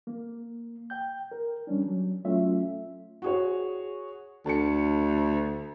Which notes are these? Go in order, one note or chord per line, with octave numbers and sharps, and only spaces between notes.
A#3
G5 G6
A#4
G3 C#4 D4
F#3
F#3 A3 C#4 F4 E5
F#4 G#4 C#5
D2 A5 C#7